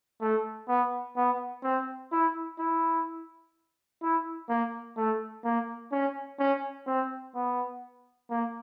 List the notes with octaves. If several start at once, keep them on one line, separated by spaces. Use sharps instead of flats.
A3
B3
B3
C4
E4
E4
E4
A#3
A3
A#3
C#4
C#4
C4
B3
A#3